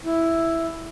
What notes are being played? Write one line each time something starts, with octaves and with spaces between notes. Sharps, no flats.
E4